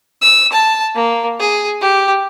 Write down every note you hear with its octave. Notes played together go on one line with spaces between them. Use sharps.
E6
A5
A#3
G#4
G4